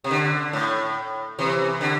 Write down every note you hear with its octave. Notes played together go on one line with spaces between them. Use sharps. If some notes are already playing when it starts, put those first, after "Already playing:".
C3
D3
A2
C3 E3
D3